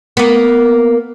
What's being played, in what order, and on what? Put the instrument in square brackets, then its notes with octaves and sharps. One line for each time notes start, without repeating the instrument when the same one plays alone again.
[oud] A#3 B3